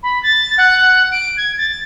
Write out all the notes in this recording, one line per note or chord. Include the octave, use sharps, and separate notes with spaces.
B5
A6
F#5
D7
G#6
A6